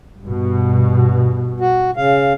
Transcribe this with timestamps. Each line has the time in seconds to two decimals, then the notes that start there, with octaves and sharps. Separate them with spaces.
0.19 G2 B2
1.60 F#4
1.97 C#3 F5